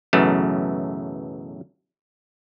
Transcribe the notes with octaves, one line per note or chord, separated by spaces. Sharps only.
B1 F#2 C#3 E3 A3